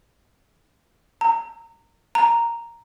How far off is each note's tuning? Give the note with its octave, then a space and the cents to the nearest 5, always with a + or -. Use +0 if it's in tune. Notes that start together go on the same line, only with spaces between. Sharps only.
A#5 -20
A#5 +0